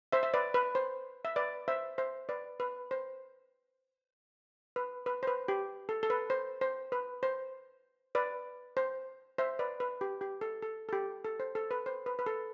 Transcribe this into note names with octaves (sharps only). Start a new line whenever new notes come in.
C5 E5
E5
B4 D5
B4
C5
E5
B4 D5
C5 E5
C5 E5
B4 D5
B4
C5
B4
B4
C5
B4
G4
A4
A4
B4
C5
C5
B4
C5
B4 D5
C5
C5 E5
B4 D5
B4
G4
G4
A4
A4
A4
G4
A4
C5
A4
B4
C5
B4
B4
A4